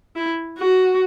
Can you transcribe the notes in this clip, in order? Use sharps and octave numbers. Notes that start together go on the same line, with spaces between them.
E4
F#4